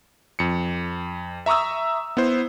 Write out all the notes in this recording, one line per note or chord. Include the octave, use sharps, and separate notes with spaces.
F2 C#7
E5 A#5 C#6 D#6 E6
B3 E4 C5